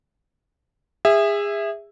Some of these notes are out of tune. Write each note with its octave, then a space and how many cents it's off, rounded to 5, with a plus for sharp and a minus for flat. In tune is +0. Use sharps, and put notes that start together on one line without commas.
G#4 -30 E5 +0